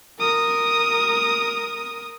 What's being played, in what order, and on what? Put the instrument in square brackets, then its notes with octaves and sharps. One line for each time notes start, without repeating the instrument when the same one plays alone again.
[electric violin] A#4 D#6